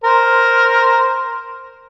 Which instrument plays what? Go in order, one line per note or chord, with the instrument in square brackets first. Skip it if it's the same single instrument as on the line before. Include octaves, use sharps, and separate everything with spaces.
[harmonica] A#4 C5